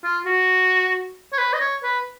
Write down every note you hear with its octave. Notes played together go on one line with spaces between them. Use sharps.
F4
F#4
C#5
B4
D#5
C#5
B4